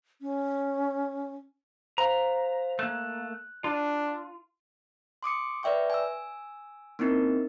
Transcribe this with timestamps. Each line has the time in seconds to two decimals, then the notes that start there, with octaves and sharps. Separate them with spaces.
0.22 C#4
1.98 C5 F5 A#5
2.79 A3 A#3 F#6
3.64 D4 F4
5.23 C6 D6 D#6 C#7
5.63 B4 D5 E5 G5 C#6
5.90 G#5 E6
6.99 A#3 C4 C#4 D#4 E4 A#4